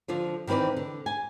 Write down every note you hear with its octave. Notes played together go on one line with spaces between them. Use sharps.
D3 F3 F4
D#3 E3 C4 B4 D5
D3
G#5